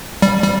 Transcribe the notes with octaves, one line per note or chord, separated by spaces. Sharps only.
G3
G3